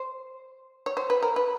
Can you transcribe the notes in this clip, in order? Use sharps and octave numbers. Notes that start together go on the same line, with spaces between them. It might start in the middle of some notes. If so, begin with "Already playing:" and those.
Already playing: C5
C#5
C5
B4
A#4
B4